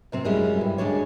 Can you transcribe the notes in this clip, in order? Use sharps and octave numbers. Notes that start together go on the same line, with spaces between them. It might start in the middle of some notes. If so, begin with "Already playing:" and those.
F#2 C3 C4
F#2 G3 G#3 C#4 E4
G2
D2 G#3 D4 C#5